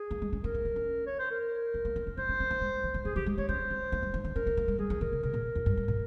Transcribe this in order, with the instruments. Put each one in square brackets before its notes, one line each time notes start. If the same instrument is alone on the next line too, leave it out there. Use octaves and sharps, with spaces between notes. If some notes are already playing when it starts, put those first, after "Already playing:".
Already playing: [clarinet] G#4
[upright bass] A#3
G#3
C#4
[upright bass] C4 [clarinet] A#4
[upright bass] A#3
C4
C#4
[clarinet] C#5
C5
A#4
[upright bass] C4
A#3
C4
C#4
[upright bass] D#4 [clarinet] C5
[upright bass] C#4
C4
A#3
G#3
F3
F3
[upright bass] F3 [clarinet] G#4
[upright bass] F3 [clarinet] G4
[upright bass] G#3
[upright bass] C4 [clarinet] C#5
[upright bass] C#4 [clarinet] C5
[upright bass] C4
A#3
G3
F3
D#3
[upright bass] C#4 [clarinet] A#4
[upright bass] C4
A#3
G#3
[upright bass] G3 [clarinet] G#4
[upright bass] F3
[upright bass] D#3 [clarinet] A#4
[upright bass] C#3
[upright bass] C3 [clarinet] A#4
[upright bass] A#2
F2
G2
G#2
A#2